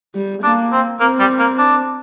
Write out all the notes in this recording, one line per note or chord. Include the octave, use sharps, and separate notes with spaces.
G3
A#3 D4
C4
A#3 C4
G3
A#3
D4